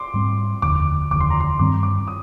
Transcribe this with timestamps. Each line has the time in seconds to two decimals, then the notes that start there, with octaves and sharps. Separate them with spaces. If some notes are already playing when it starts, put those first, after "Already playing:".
Already playing: C6 D6
0.14 G#2 G3 C4
0.62 F1 D#2 D3 D6
1.11 F1 D#2 D3 D6
1.21 C6
1.30 A#5
1.40 C6
1.59 G2 D#3 G3 C4 D6
1.83 D6
2.08 D#6